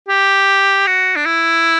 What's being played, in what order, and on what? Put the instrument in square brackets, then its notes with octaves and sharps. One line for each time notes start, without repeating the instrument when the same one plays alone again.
[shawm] G4
F#4
D4
E4